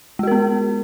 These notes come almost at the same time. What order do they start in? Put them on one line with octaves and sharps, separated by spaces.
G#3 F#4 A#4 B3